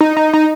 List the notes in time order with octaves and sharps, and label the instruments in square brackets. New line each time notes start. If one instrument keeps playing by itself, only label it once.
[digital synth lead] D#4
D#4
D#4